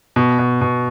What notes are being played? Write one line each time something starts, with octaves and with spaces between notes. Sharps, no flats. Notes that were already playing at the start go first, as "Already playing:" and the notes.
B2
B2
B2